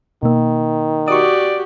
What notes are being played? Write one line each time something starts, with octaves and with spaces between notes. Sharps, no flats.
B2 D#3 A#3
F#4 G4 D5 C#6 D#6